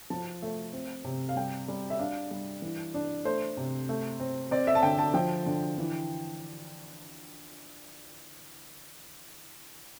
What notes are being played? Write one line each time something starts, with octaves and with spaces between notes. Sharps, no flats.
F3 A5
A3
C4
C3
F5
G3 G5
G3
E5
D4 F5
G3
E3
D4
A3 C5
C3
A3
C4
C4 D5
E5
A5
D3 G5
A5
F3 G5
D3
E3